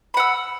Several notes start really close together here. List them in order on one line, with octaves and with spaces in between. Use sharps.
B5 F#5 E6